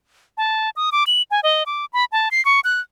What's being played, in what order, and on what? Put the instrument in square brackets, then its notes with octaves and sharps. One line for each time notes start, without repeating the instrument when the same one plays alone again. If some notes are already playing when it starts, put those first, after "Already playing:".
[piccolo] A5
D#6
D6
F#7
G#5
D#5
D6
B5
A5
C7
C#6
F#6